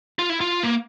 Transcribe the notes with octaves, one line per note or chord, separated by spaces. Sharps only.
F4
E4
F4
A#3